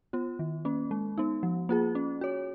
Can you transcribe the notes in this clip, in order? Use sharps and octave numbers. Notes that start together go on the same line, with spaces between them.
B3 F4
D#3
A#3 C#4
G#3
B3 D#4
F3
A#3 F4 G#4
C#4
F#4 C#5